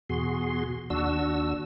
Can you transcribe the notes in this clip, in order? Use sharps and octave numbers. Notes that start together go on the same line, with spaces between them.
E2 B2 F#4 G#4 C6
D#2 D4 F#4 E6